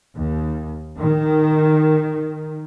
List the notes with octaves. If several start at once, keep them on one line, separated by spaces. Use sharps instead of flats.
D#2
D#3